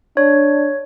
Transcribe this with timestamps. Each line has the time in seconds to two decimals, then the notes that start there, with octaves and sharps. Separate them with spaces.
0.17 D4 C#5